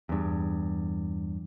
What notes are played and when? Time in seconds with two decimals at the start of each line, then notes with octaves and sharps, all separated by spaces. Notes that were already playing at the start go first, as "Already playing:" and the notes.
0.09 E2 G2